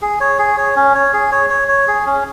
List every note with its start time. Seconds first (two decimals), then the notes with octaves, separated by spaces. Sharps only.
0.02 G#4
0.20 C#5
0.39 G#4
0.58 C#5
0.76 C#4
0.94 C#5
1.13 G#4
1.32 C#5
1.50 C#5
1.68 C#5
1.88 G#4
2.06 C#4